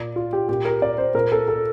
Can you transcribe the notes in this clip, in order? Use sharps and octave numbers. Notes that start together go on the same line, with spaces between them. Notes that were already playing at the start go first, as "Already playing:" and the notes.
Already playing: A#2 D5
F4
G4
A#2 G4
A#4
D5
C5
A#2 A#4
A4
A4